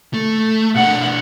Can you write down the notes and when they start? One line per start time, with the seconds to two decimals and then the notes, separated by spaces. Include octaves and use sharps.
0.14 A3
0.75 B2 D4 F#5